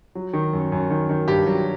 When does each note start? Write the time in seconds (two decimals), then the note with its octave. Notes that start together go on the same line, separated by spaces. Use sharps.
0.15 F#3
0.33 D#3
0.53 F#2
0.72 F#2
0.90 D#3
1.09 D#3
1.28 G2 G4
1.46 F#3